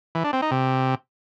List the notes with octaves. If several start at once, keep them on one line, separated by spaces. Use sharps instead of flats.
E3
D4
C4
D#4
C3